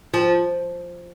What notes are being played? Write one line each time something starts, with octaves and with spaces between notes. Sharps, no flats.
F3